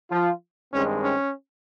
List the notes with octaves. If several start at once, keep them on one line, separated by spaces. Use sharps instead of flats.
F3 F4
G2 D#3 G#3 C4 C#4
C#4